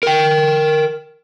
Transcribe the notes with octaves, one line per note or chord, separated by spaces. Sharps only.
A#4 G5